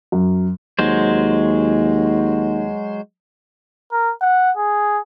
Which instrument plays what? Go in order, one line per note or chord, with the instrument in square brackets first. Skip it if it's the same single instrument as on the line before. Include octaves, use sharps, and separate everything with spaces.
[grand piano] F#2
[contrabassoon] D#2 [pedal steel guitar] F#3 G#3 C5
[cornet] A#4
F#5
G#4